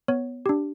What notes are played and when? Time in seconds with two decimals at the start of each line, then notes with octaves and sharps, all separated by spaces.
0.08 B3 C#5
0.46 D4 G4